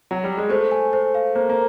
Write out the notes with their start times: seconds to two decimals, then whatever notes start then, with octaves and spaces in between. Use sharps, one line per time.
0.11 F#3
0.24 G3
0.37 G#3
0.49 A3 C5
0.71 G#5
0.93 C5
1.15 F5
1.35 A#3 C5
1.49 A#3